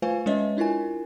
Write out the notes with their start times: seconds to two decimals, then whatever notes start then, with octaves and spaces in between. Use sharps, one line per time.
0.02 A3 F4 B4 C5 F5 G#5
0.26 G#3 C#4 B4 C#5 D#5 E5
0.57 D4 E4 F4 A#4 G#5